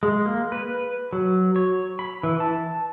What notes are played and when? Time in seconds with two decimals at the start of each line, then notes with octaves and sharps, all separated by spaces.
0.03 G#3
0.26 A#3
0.52 B4
1.13 F#3
1.56 C#5
1.99 B5
2.23 E3
2.40 A5